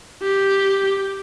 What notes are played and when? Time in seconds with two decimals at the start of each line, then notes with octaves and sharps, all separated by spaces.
0.23 G4